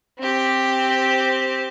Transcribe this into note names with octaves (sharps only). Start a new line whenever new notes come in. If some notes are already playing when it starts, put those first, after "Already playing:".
C4 G4